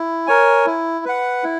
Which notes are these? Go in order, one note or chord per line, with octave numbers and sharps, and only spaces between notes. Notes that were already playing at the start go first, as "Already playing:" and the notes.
Already playing: E4
A#4 C#5 G#5
E4
B4 F#5
E4